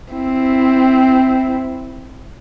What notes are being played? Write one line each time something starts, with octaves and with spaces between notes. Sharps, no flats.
C4 E4